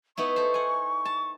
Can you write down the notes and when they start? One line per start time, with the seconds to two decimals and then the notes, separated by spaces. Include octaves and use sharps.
0.17 B3 D#4 E4 C#6
0.36 A4 C5
0.54 F#5 G#5
1.05 A5